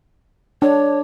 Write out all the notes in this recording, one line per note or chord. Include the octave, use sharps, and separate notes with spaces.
D4 C#5